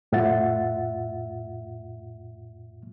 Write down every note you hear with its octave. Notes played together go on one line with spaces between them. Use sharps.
F2 A2 F4 E5 F#5 A6